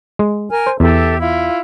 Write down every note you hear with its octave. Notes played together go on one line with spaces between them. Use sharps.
G#3
A#4 G#5 F6
C5
E2 G4 A4 E5
E4 F4